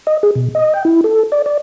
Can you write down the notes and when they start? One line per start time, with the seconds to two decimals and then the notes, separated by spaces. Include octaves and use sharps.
0.07 D#5
0.23 G#4
0.35 B2
0.55 D#5
0.74 G5
0.85 E4
1.04 A4
1.32 D5
1.46 D5